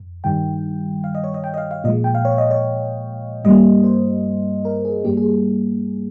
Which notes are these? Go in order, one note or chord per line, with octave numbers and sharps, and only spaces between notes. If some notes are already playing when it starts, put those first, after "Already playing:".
Already playing: F2
G2 D#3 G3 G5
F5
D#5
C#5
D#5
G5
D#5
F5
F5
A#2 F3 G#3 D#5
G5
F5
C#5
D#5
C#5
G2 G3 A#3 D#5
C5
A#4
G#4
G2 G3 A#3 G4
G#4